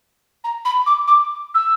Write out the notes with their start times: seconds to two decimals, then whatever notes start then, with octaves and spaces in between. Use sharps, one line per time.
0.44 A#5
0.65 B5
0.86 D6
1.07 D6
1.54 E6